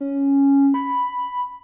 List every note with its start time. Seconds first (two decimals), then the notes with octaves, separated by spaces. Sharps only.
0.01 C#4
0.74 B5